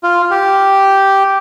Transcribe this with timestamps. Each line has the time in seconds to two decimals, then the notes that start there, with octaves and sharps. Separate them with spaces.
0.03 F4
0.31 G4